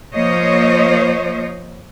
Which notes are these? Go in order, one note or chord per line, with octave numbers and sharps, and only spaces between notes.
F3 A#3 C5 C#5 D#5